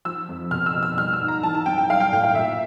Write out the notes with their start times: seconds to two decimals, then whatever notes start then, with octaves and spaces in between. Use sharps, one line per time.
0.05 F3 E6
0.29 F2
0.51 B2 F6
0.66 E6
0.74 B2
0.83 E6
0.97 G3 F6
1.13 E6
1.20 G#2
1.28 A#5
1.43 E3 A5
1.55 A5
1.66 F#2 G5
1.78 G5
1.89 G3 F5
2.00 G5
2.12 A2 G5
2.24 F5
2.35 A#2 E5